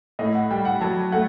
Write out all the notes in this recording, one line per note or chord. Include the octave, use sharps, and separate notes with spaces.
A2 D#5
F#5
G3 G5
F#5
F#3 A5
A3 F#5